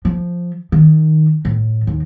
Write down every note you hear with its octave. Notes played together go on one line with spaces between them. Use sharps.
F3
D#3
A2
D#2